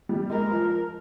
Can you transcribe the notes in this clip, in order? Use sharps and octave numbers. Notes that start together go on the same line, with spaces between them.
G3
G#3 A#4
F3